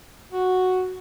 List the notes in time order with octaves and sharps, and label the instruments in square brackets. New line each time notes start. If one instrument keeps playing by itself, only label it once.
[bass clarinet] F#4